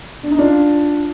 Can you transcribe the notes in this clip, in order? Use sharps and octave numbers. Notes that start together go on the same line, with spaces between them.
D4
D#4
D4 F4